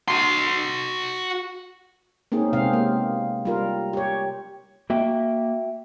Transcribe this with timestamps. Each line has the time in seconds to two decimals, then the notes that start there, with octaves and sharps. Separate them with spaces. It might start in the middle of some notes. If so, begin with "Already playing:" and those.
0.08 F#4 C6
2.32 A#3 C4 C#4 D#4 G#4
2.53 C3 G#3 B3 C4 F5
2.73 A#3
3.45 G3 F4 A#4
3.93 G4 C#5
4.90 A#3 F#4 E5 G5